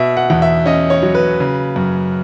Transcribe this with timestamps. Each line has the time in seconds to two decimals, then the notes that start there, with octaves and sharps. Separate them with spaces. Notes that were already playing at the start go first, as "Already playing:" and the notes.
Already playing: B2 E5
0.17 F#5
0.30 E2
0.42 E5
0.66 C#4 D#5
0.90 C#5
1.03 F#3
1.15 B4
1.40 C#3
1.76 F#2